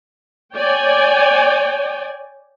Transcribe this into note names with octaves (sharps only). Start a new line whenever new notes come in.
C#5 D5 G5 G#5